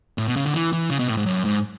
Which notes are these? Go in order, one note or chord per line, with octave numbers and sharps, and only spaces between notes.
A2
B2
C#3
D3
E3
E3
C#3
B2
A2
G#2
F#2
G#2